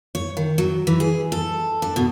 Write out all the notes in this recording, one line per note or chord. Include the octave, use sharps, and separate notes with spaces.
C#5
D#3
F#3
E3
G#4
A4
D4
B2